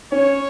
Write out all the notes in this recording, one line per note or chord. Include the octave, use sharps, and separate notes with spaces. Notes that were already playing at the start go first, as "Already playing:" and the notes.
C#4 C#5